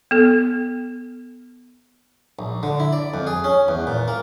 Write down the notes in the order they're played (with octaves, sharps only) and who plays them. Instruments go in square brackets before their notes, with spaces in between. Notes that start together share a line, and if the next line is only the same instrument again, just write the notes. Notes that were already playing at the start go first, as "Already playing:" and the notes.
[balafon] B3 A4
[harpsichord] A#1
D3
E4
D5
F2
G#4
C#4
E2
A#2
A#3